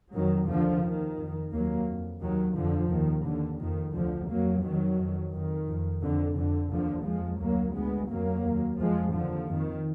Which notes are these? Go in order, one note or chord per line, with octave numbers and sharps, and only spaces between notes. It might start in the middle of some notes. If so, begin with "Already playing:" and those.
F2 D#3 F#3
D#2 D3 F3
D#2 D#3
F2
D#2 F#3 A#3
F2
D#2 D#3 F#3
F2 D3 F3
D#2 D#3
D#2 D3
F2 D#3
D2 D3 F3
F2 F#3 A#3
F2 D#3 F#3
F2
F2 D#3
F2
F2 D3
F2 D3
D#2 D3 F3
F2 F3 G#3
D2 F#3 A#3
D2 G#3 B3
F2 F#3 A#3
D#2
F2 F3 G#3
D#2 D3 F3
F2 D#3